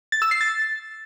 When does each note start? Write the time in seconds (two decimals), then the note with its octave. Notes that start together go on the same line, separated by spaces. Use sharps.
0.12 A6
0.22 E6
0.31 C7
0.41 A6